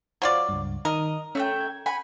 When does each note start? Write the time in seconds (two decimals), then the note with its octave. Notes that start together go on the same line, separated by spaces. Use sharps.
0.22 F#3 F4 C5 D5 F5
0.49 C#2 G2
0.85 D#3 A#4 D#5
1.35 A3 C#4 E5 G5
1.61 G#6
1.86 F#5 G#5 B5